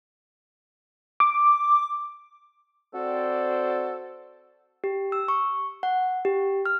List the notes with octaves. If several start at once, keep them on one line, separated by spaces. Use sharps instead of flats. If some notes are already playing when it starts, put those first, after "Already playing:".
D6
C4 F#4 A4 C5 D5
G4
E6
C#6
F#5
G4
F6